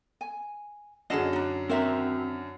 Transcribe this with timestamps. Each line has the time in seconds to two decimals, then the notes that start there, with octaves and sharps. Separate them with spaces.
0.21 G#5
1.10 F#2 D3 G#4 C#5 D#5 E7
1.33 D4 D#4
1.69 C4 F#4 A#4 C5 E5 A#5